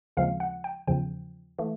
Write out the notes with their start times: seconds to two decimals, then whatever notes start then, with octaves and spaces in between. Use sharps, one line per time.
0.17 D#2 C#3 F3 G#3 C4 F5
0.40 F#5
0.64 G5
0.88 E2 C#3 F3 G5
1.59 E3 A3